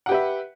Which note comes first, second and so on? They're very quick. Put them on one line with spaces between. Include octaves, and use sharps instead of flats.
F#5 G4 B4 E5